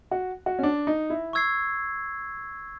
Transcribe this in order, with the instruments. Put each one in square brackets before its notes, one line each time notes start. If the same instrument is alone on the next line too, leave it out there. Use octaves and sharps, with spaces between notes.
[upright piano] F#4
F#4
C#4
D4
D#4
E4
[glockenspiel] C#6 E6 G#6 C7